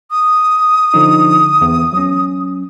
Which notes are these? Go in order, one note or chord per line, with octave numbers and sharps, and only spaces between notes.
D#6
D3 F3 D#4
E2
F#3 C#4